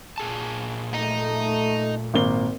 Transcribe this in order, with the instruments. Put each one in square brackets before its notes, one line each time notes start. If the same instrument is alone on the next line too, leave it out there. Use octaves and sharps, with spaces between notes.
[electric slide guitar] A#2 G#4 A5
[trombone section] A3 [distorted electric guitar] D#4
[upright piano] G#1 A#3 G7